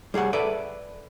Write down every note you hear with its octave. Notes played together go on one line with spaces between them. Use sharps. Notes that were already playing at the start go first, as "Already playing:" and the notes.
G3 G#4 C#5 F#5
A4 B4 D5 E5